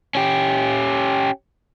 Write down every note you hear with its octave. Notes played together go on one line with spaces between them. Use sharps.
C#4 G4